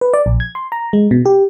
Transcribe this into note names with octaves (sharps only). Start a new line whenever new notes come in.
B4
D5
A#1
G#6
C6
A#5
G#3
B2
G4